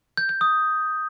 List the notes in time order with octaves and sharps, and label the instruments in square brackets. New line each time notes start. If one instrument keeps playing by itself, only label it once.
[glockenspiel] G6
G6
D#6